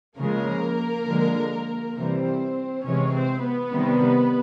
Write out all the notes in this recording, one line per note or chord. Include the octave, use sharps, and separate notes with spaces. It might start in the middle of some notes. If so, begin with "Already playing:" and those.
C#3 F3 G#3 A#3 A#4
D3 F3 G#3
C3 E3 G3 C4 C5
C3 E3 G#3 C#4 C#5
C4 C5
B3 B4
C3 D#3 G3